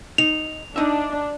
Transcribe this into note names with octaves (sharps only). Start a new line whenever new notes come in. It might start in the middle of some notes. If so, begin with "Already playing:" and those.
D#4 F7
D4 D#4 E5